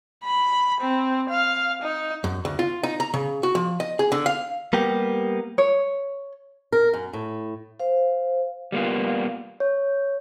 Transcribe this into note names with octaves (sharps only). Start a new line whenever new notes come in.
B5
C4
F5
D#4
F#2
D2
F4
D#4
A#5
C#3
F#4
F3
D#5
G#4
D3
F5
G3 A#3 B3 G4
C#5
A#4
F#2
A2
C5 F5
G3 A#3 B3 F4
C#5